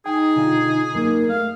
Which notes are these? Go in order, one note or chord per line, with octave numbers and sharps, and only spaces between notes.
D#4 G#4 G5 G#5
B2 D3 F4
F#2 A#3 D#4 A#4
A3 F5